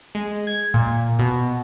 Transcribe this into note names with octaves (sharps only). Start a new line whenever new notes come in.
G#3
G#6
A#2
B2